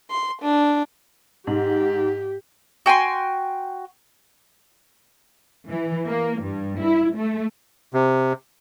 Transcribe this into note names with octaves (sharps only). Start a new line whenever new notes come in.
C6
D4
G#2 G4
F#4 G5 G#5 C6
E3
A#3
G2
E4
A3
C3